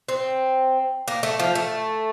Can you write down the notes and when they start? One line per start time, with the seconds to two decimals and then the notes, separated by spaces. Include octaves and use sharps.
0.09 C4
1.08 A#3
1.23 A3
1.39 F3
1.55 A3